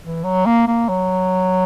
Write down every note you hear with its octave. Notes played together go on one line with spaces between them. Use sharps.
E3
F#3
A#3
A#3
F#3